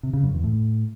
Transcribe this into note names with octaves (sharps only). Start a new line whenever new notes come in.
C3
C#3
F#2
E2
A2